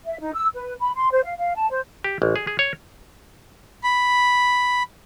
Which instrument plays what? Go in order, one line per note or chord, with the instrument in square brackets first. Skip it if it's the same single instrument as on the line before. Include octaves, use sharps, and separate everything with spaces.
[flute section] E5
D#4
E6
B4
B5
C6
C5
F5
F5
A5
C5
[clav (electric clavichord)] G4
A1
G#4
G#4
C#5
[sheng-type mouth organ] B5